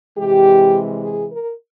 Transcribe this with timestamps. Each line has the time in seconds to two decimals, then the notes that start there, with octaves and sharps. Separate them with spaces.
0.18 C3 E3 G#3 G4
1.04 G#4
1.33 A#4